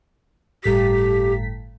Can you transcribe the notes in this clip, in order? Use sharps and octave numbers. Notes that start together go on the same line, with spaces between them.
G1 A2 G4 B6